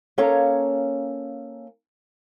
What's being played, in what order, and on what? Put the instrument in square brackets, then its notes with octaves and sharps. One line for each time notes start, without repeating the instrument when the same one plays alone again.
[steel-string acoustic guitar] A#3 C#4 A4 C#5 F5 A#5